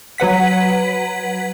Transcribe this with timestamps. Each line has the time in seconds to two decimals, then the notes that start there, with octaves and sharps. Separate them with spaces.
0.18 F#3 B4 F#5 B6